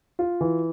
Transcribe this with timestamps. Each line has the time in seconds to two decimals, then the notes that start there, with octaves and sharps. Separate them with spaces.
0.19 F4
0.41 E3